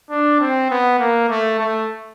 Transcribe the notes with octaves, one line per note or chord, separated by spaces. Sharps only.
D4
C4
B3
A#3
A3
A3